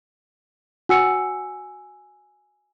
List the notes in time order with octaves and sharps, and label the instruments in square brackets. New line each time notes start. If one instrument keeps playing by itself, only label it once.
[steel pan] F#4 [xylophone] G#5 E6 C#7